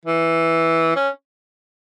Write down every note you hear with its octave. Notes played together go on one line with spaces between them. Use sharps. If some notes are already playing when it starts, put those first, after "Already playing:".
E3
C#4